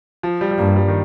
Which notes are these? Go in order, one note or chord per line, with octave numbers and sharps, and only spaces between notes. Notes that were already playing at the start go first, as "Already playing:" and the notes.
F3
G3
G3
G2 A#3
G3
D#3